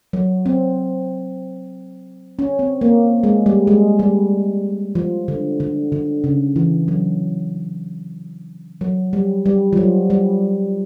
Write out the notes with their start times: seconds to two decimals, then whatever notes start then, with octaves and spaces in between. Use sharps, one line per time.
0.13 F#3
0.46 C4
2.39 C#4
2.59 C4
2.81 A#3
3.23 G#3
3.46 G3
3.67 G#3
3.99 G3
4.95 F3
5.28 D3
5.60 D3
5.92 D3
6.24 C#3
6.56 E3
6.88 F#3
8.81 F#3
9.13 G3
9.46 G3
9.73 F3
9.77 F#3
10.10 G3